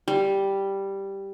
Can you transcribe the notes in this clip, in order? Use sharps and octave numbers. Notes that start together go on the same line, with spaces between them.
G3